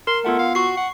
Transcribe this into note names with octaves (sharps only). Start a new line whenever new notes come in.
A#4 C6
A3 B3 F4 F#5
F5
F#4 C#6 C7
F#5